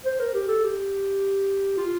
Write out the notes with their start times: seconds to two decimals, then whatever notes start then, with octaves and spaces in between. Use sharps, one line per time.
0.05 C5
0.20 A#4
0.34 G4
0.48 A4
0.64 G4
1.78 F4